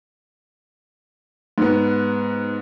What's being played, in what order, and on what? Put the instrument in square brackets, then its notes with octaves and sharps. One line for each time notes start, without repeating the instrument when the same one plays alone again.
[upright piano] G#2 B3